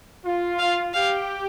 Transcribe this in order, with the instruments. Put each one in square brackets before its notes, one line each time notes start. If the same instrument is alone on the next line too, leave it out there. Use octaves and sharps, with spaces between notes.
[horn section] F4
[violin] F5
[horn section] G4 [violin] F5